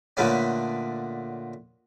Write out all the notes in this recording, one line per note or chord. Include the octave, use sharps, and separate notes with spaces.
A#2 D3 A3 B3 C#4